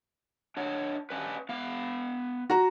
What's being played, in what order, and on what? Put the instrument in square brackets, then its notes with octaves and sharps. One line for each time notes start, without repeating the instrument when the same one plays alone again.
[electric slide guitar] D4 C#5 F#5
C#4 D4 B4
B3 F5
[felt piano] F#4 A#5